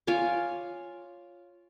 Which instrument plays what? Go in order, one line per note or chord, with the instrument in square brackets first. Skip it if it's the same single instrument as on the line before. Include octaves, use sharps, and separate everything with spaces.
[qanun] F4 C#5 G#5 D6